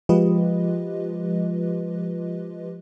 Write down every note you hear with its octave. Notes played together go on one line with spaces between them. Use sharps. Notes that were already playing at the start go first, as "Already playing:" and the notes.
F3 G#3 F4 G4 B4 D#5